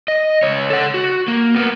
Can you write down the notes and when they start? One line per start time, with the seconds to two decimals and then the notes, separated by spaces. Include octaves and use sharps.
0.08 D#5
0.43 C#2 C#5
0.70 A4 F#5
0.94 F#4
1.28 A#3
1.56 A#3 B3